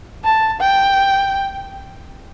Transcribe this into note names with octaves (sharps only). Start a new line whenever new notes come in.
A5
G5